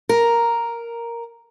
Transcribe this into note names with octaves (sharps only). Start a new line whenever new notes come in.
A#4